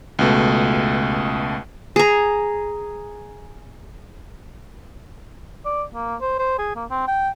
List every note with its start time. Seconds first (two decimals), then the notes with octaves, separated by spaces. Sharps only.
0.19 C#2 B2 A3
1.96 G#4 A#5
5.65 D5
5.95 A#3
6.21 C5
6.39 C5
6.59 G#4
6.76 A#3
6.90 C4
7.08 G5